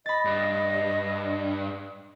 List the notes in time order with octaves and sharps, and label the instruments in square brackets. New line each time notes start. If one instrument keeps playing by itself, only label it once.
[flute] D#5 [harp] B5 A6
[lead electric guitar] G2